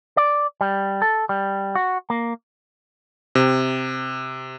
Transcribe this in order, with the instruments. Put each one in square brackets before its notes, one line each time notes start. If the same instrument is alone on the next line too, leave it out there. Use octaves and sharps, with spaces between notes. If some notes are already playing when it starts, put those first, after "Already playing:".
[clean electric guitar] D5
G3
A4
G3
F#4
A#3
[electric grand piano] C3